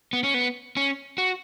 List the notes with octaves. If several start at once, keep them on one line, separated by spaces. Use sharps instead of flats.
B3
C#4
B3
C#4
F#4